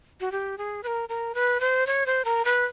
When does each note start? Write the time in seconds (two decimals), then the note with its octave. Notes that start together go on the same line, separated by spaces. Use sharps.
0.21 F#4
0.32 G4
0.58 G#4
0.83 B4
0.87 A#4
1.09 A#4
1.35 B4
1.60 C5
1.87 C#5
2.06 C5
2.25 A#4
2.45 B4